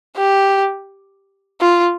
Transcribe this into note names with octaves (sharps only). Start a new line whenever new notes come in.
G4
F4